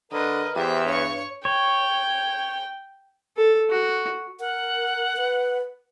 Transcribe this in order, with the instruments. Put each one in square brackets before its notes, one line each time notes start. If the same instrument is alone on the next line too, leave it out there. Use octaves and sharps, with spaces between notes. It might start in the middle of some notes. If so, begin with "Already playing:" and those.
[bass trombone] D3 [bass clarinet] A#4 [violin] B4 D#5
[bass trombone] E2 [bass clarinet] G4 [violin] C5 E5
[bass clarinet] G2 [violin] C#5 C#6
[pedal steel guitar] C#5 [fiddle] G5
[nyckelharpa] A4
F#4
[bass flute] A#4 [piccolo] F#5
[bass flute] B4